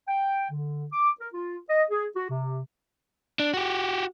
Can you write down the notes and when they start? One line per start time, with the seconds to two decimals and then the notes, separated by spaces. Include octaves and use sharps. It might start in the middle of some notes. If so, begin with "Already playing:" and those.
0.08 G5
0.50 D3
0.92 D6
1.21 A#4
1.34 F4
1.69 D#5
1.91 G#4
2.16 F#4
2.30 C3
3.40 D4
3.54 F#4 G4